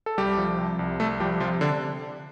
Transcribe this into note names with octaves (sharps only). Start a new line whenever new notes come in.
A4
C2 G3 G4
F3
C3
C2
C2 A3 A4
F3 G3 G4
C3 F3 F4
D3 D4